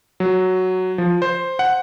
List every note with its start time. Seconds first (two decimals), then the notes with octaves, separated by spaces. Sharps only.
0.20 F#3
0.98 F3
1.22 C5
1.59 F#5